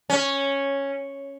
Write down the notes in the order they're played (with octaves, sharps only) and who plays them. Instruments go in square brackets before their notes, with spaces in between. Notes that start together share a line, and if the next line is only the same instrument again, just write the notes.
[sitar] C#4